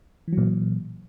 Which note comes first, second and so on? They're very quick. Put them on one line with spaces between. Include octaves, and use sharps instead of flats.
E3 F#3 A#2